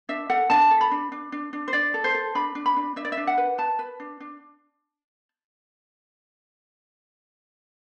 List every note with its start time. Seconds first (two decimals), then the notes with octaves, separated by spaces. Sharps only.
0.09 D4 E5
0.30 A4 F#5
0.50 D4 A5
0.71 A4
0.81 B5
0.91 D4
1.12 D4
1.32 D4
1.53 D4
1.68 C5
1.73 D4 D5
1.94 A4
2.04 C5
2.15 A4
2.35 D4 B5
2.55 D4
2.66 B5
2.76 D4
2.96 D4 E5
3.05 D5
3.12 E5
3.17 D4
3.27 F#5
3.38 B4
3.58 B4 A5
3.79 B4
4.00 D4
4.20 D4